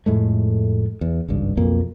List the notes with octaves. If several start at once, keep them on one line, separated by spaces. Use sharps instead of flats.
F2 A2 G#3 A3
E2
G#1 C#2 G2
B1 F2 A#3